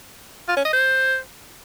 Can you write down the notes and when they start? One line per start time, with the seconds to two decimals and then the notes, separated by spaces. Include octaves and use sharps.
0.48 F4
0.57 C#4
0.65 D#5
0.73 C5